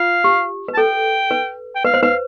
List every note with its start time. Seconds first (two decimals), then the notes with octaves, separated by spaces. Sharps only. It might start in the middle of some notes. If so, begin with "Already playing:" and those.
Already playing: F4 F5
0.24 G4
0.68 B4
0.74 A5
0.77 A4 G5
1.31 B4
1.75 G5
1.85 B4 F5
1.94 C5
2.02 B4 F5